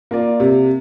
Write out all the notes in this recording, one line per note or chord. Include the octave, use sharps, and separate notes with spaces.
A#3 F4 D5
C3